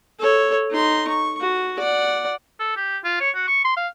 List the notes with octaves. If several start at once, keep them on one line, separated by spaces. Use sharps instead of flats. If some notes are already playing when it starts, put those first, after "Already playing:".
A4 C#5
D#4 C6
C#6
F#4
D5 F#5
A4
G4
F4
C#5
F#4
C#6
C6
F5